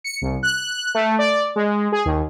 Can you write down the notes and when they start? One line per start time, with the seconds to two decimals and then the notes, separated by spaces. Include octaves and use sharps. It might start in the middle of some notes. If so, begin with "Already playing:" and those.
0.04 C#7
0.22 C2
0.43 F#6
0.95 A3
1.19 D5
1.56 G#3
1.92 G#4
2.05 D#2